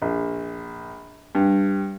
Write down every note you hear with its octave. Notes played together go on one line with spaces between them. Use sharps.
A#1
G2